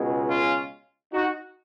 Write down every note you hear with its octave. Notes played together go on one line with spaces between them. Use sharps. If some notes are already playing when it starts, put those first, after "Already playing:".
Already playing: C#2 B2 G#3
C#4 F4
D#4 F#4